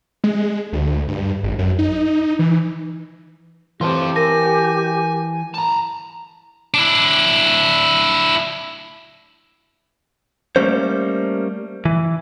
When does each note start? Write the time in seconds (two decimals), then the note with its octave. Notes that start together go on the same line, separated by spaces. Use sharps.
0.24 G#3
0.73 D2
1.08 G2
1.43 G#1
1.59 F#2
1.79 D#4
2.39 E3
3.81 E3 C4 F4 G4 B4 A5 C6
4.16 A#4 G#5 A#6
5.54 A5 A#5
6.74 D4 E4
10.56 G3 A3 A#3 C#4 C5
11.85 E3